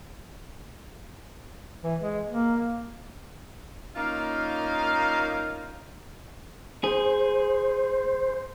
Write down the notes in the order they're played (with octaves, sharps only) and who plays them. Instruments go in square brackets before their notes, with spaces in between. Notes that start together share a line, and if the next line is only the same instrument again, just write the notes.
[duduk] E3
G#3
A#3
[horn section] A#3 C#4 D#4 F4 F5
[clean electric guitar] G#4 [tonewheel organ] C5